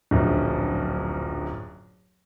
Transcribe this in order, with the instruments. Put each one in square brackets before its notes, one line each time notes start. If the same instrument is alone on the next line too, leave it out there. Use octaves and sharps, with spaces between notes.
[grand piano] D1 A#1 F#2